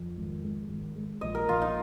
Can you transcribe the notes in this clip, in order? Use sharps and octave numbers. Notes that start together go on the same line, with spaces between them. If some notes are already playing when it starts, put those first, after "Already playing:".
Already playing: F2
G#1
G#3
G#1
G#3
A#1 D#5
A#4
A#1 F4
D#4